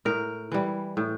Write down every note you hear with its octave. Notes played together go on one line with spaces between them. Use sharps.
A2 A#4
E3 G3
A2